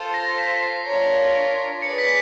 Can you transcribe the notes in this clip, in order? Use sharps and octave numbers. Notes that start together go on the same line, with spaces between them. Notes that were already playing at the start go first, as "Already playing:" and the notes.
Already playing: F4 A4 C5
A#6
B6
C7
D4 F4 A#4 C#5
G#4 B4 D5 C#7
B6